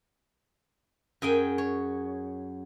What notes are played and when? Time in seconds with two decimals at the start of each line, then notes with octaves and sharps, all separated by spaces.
1.22 F#2 G#4 G5 G#5
1.58 C#5